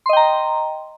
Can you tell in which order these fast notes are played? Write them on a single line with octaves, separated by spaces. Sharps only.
C6 D#5 G5 A#5